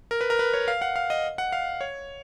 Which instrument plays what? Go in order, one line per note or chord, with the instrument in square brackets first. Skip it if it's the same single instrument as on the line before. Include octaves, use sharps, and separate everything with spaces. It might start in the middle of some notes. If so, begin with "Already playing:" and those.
[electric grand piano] A#4
B4
A#4
B4
C#5
F5
F#5
F5
D#5
F#5
F5
C#5